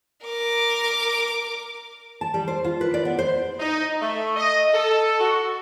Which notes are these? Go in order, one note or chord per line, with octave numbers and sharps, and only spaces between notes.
A#4 D6
A5
G3
C5
F4
B4
D5
B3
C5
D#4
A3
D#5
A4
F#4